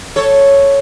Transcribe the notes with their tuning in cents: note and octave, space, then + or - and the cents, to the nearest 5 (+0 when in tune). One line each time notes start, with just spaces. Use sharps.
A4 +0 C#5 +0